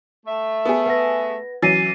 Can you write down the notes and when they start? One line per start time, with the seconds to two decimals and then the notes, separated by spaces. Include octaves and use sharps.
0.26 A3 E5
0.65 B3 G#4
0.86 B4 F#5 A#6
1.62 E3 F#3 C#4 A6 C7 D#7